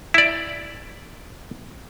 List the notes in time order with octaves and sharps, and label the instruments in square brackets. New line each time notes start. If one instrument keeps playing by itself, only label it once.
[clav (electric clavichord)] E4 D5